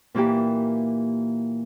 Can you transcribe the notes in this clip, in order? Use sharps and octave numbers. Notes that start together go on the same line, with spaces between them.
A#2 E3 A#3 G4